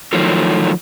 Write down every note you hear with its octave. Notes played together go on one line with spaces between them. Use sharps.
D#3 F3 F#3 A3